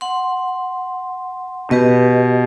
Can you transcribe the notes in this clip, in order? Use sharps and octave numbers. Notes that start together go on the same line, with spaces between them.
F#5 C6
B2 G4 B4 D#5